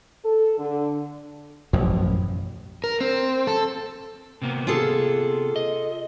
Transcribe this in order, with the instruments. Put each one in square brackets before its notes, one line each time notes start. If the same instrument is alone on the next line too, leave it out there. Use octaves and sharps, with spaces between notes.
[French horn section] A4
D3
[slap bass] A1 F#2 B2 F3
[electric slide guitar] A#4
C4
A4
C3 A#3 B3
[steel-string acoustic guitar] F4 G#4 A4
[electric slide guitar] D#5